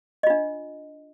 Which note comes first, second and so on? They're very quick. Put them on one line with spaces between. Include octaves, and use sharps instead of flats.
D#5 F4 D4